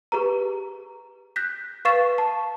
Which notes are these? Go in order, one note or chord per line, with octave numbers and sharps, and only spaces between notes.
G4 G#4 B4 A#5
F#6 G6 A#6 B6
B4 F5 C#6 A6 C7 E7
A5